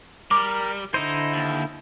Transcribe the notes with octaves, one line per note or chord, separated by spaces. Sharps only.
G3 A#4 D6
D3 D#4 E4 C5
D#2